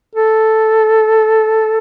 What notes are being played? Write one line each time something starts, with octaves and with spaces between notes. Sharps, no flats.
A4